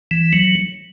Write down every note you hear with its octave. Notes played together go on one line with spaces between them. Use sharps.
E3
F#3